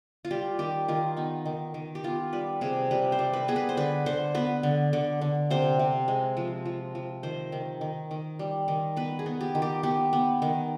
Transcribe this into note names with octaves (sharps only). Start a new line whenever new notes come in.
F4
G3 G4
D#3 G4
D#3 F4
B3 D#4
D#3
D#3
G4
B3 F4
G3 B4
C3 G#4
G3 B4
C5
G3
B4
B3 G#4
B4
C5
D3 B4
D3 C5
B3 B4
D3
D3
D3
C3 C5
C3
G#3
F3
F3
F3
D#3 C5
D#3
D#3
D#3
G3
D#3
B3 B4
G#4
B3
G4
D#3
G4
B3 G4
B3
D#3